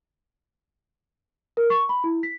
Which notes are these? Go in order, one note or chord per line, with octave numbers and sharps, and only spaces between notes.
A#4
C#6
B5
E4
B6